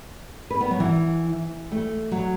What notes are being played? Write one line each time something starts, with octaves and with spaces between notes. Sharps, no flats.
B4
B3
F#3
E3
A3
F#3